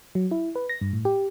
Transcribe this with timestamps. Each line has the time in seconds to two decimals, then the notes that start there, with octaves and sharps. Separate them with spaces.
0.15 F#3
0.31 E4
0.55 B4
0.69 A#6
0.81 G2
0.93 A2
1.05 G4